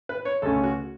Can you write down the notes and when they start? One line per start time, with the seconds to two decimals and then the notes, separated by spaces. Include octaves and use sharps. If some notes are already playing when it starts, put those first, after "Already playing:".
0.09 B4
0.25 C#5
0.42 C#2 C#3 A3 C#4 A4
0.63 F#4